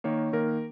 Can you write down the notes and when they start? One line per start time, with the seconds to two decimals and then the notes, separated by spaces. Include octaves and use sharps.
0.04 D#3 A#3 C#5
0.33 D#3 A#3 A#4